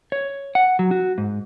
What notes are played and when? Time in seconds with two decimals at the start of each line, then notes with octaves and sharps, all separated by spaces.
0.12 C#5
0.55 F#5
0.79 F#3
0.91 F#4
1.18 G#2